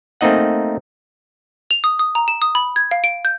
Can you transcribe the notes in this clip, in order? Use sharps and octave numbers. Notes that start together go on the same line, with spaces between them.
A3 A#3 C4 D#4 D#5 F#5
F7
D#6
D#6
A#5
E7
D#6
B5
G#6
F5
D7
G6